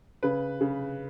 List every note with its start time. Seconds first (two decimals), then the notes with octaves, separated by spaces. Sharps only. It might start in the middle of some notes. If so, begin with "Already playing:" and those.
0.23 C#3 B4
0.61 C#3